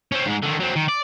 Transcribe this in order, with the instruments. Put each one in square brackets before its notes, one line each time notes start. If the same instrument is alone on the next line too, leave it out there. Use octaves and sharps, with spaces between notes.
[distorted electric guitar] C4 C#4
G#2 G#3
D3 D#3
F#3 C4
D#3
D5